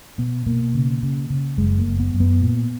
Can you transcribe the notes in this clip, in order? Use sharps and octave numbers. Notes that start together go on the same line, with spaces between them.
B2 B3
B2 A#3
C#3
C#3
C#3
F#1 G#3
A#3
F#1
B3
F#2
B3
A#2